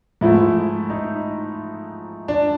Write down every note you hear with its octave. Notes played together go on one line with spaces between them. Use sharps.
G#2 F3 A3 E4
D#4
D4